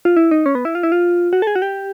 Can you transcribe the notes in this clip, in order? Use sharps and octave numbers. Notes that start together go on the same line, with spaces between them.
F4
E4
D#4
C#4
B3
E4
F4
E4
F4
F#4
A4
G#4
F#4
G4